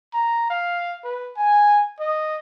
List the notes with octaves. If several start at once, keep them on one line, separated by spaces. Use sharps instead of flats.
A#5
F5
B4
G#5
D#5